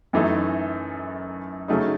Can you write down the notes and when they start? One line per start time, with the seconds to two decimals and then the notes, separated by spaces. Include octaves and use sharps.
0.13 F#2 E3 A3 D#4
1.68 C#3 F#3 A3 D#4